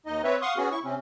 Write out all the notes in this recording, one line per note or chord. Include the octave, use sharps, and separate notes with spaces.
D#2 D#4 D#5
C4 B4 C#5 E5
F5 F#5 C6 C#6 D#6
B3 C#4 F#4 G#4
E4 C#6
C3 C4 C#4